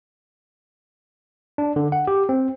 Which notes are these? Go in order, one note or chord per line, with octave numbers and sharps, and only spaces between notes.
D4
D3
F#5
G4
C4